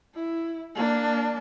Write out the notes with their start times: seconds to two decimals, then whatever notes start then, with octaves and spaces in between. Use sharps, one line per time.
0.15 E4
0.75 A#3 D4